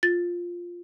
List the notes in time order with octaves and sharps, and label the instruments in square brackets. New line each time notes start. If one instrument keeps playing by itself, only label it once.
[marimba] F4 [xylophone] A6